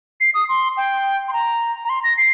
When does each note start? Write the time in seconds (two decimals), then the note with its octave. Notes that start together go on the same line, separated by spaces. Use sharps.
0.20 C7
0.34 D#6
0.49 C6
0.77 G5
1.28 C6
1.33 A#5
1.84 A#5
1.89 C6
2.04 A#6
2.17 C7